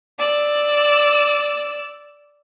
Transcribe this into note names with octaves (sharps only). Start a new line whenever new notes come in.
D5 E6